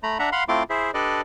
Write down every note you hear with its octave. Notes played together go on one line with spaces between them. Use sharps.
A3 A#5 B5
D4 E5 F#5 A#5
F5 F#5 B5 C6
A3 C4 E4 F4 C6 D6
E4 G#4 C5 E5
D4 G4 A4 B4 D5 D#5